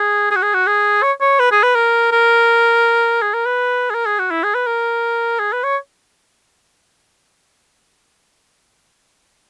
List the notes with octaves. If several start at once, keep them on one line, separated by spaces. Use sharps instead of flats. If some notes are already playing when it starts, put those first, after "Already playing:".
Already playing: G#4
G#4
F#4
G#4
F#4
G#4
C#5
C#5
B4
G#4
B4
A#4
A#4
G#4
A#4
B4
G#4
A#4
G#4
F#4
E4
G#4
B4
A#4
G#4
B4
C#5